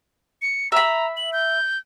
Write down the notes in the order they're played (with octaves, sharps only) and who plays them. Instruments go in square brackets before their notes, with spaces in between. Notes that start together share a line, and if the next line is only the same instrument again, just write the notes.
[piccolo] C#7
[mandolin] E5 B5 [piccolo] A#5
[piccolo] F#7
G6